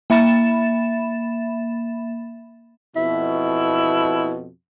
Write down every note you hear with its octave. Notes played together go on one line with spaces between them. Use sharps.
A#3 E5 B5 A6 E7
F2 B2 E4